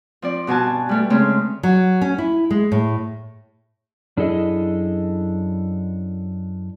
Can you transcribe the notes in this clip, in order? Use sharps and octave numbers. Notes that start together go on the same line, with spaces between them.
F3 C4 D5
G2 B2 F#4 G#5 A5
G3 A3 G4
C#3 G#3 A3 C4
F#3
C#4
E4
G#3
A2
F#2 D4 E4 G#4 A4 D#5